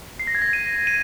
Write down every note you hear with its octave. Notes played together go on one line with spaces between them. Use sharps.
C7
A#6
G#6
A#6
D#7
D#7